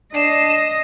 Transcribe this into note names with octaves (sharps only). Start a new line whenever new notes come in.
D4 D#5 C7 E7